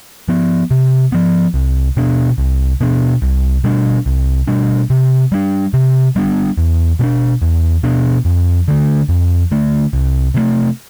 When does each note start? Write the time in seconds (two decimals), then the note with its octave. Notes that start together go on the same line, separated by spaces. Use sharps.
0.28 F3 B3
0.71 C3
1.12 F3 B3
1.54 C2
1.97 B2 B3 D4
2.38 C2
2.80 B2 B3 D4
3.22 C2
3.64 B2 G3 D4
4.06 C2
4.47 B2 G3 D4
4.90 C3
5.32 G3 B3 D4
5.74 C3
6.16 G3 B3 D4
6.58 E2
6.99 B2 B3
7.03 D4
7.42 E2
7.83 B2 B3 D4
8.25 F2
8.68 D3 A3
9.09 F2
9.51 D3 A3
9.93 C2
10.34 C3 E3 A3